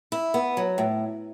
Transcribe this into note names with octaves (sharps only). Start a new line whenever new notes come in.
E4
B3
F#3
A2